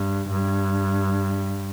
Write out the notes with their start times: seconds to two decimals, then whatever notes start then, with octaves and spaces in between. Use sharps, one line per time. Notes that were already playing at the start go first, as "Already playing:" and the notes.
Already playing: G2
0.31 G2